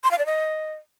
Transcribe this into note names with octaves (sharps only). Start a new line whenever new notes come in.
C6
F5
D5
D#5